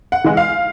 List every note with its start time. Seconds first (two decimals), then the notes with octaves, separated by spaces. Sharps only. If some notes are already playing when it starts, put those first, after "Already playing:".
0.12 F#5
0.24 E3 G#3
0.37 F5